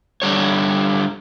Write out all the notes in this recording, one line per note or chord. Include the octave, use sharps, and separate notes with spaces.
D3 G3 C#5